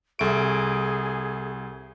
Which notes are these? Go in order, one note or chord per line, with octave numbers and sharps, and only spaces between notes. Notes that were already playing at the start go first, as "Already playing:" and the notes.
C2 G#4 A4 E5 C#6 D7